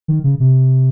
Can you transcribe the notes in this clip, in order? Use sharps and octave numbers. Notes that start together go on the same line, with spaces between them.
D#3
C#3
C3